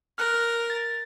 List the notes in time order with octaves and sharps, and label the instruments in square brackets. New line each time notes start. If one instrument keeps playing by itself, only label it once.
[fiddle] A#4 [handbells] F6 F#6
[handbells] A6